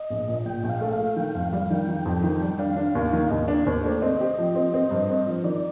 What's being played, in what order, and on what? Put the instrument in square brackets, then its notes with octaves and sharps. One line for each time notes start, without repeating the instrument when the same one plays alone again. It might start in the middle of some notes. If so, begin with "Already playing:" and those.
Already playing: [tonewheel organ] D#5
[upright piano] A#1
A#2
[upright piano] A#2 [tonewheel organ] G5
[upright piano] A#1 [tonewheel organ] G5
[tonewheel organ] F5
[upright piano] A3
[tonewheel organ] F5
[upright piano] A3
[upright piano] D#3 [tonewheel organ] G5
[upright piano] F2 [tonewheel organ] F5
[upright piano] G3 [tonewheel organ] F5
[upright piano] D#3 [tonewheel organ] G5
[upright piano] D#3
F2
D#3
G3
[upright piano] D4 [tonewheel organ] F5
[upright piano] D4
[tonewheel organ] F5
[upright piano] D#2
[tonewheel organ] F5
[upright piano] D#3
[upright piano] D#2 [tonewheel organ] D#5
[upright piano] D4 [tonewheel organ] D5
[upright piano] D#2 [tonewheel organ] C5
[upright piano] A3 [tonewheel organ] D5
[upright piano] C4 [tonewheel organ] D#5
[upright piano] G4
F3
C4
C4
G2
C4
F3
[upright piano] D#3 [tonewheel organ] D5